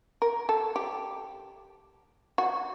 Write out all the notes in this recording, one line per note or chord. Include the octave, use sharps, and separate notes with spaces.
A#4
A4
G4
F#4